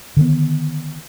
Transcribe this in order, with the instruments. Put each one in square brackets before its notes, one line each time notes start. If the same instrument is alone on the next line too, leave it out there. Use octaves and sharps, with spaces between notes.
[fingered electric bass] D3 D#3 B3